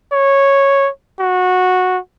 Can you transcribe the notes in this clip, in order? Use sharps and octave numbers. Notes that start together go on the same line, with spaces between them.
C#5
F#4